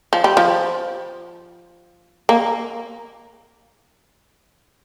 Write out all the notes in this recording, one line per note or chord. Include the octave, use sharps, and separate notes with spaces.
F3
G3
F3
A#3